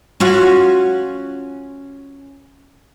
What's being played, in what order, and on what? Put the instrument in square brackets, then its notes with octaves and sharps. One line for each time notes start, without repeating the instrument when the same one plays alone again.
[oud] C#4 F4 F#4